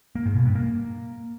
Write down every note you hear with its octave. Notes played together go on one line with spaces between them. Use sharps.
A#3
G#2
B2
G2
A#3